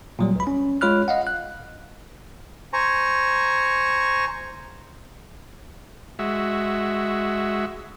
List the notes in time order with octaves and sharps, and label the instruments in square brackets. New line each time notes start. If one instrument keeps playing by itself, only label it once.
[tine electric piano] A#2 F#3 G3
C#2 B5
C#4
G#3 F4 C#5 B5 F6 F#6
D#5 F5 F#5
F#6
[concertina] C5 G#5 A#5 C#6
[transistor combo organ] G#3 F#4 E5